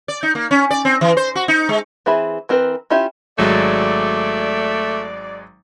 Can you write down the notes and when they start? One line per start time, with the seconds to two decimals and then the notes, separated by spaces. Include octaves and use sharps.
0.08 D5
0.23 D#4
0.35 A#3
0.51 C#4
0.71 D5
0.85 C4
1.01 E3
1.17 C5
1.35 F#4
1.48 D#4
1.69 G#3
2.06 E3 C4 G#4 E5 B5
2.49 E3 C4 A#4 B4
2.90 C#4 E4 F4 G4 E5
3.38 G#1 F#3 G#3 A3 D5